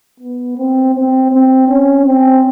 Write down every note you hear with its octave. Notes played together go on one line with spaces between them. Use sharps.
B3
C4
C4
C4
C#4
C4